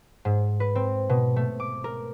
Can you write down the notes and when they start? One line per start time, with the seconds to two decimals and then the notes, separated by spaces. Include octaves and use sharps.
0.25 G#2
0.60 B4
0.75 C4
1.09 B2
1.36 A3
1.60 D6
1.84 A#4